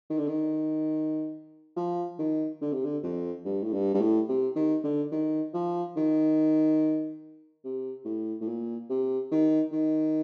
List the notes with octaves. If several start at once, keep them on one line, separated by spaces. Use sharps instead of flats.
D#3
D3
D#3
F3
D#3
D3
C3
D3
F2
G2
A2
G2
G2
A2
C3
D#3
D3
D#3
F3
D#3
C3
A2
A2
A#2
C3
D#3
D#3